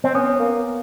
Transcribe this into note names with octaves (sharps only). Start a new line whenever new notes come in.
C4
B3 C#4
A#3